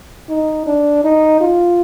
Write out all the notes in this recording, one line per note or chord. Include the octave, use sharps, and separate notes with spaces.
D#4
D4
D#4
F4